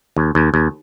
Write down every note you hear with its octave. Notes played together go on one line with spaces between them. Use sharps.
D#2
D#2
D#2